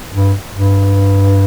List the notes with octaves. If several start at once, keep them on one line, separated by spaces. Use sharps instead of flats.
G2
G2